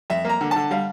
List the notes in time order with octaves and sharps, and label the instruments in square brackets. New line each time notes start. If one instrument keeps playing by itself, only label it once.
[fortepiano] F2 E5
A#3 A#5
D3
A5
D3
G3 F5